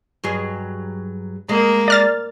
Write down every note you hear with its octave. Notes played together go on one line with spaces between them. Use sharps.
G2 F#3 G#4
G#3 A#3
D5 F6 A6